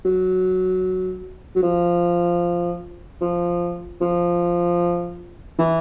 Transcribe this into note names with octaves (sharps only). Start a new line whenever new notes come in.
F#3
F#3
F3
F3
F3
E3